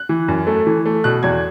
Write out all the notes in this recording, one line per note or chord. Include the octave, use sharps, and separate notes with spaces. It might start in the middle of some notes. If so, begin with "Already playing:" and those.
Already playing: F#6
E3
F#2
A3
E3
A3
B2 F#6
E2 G#6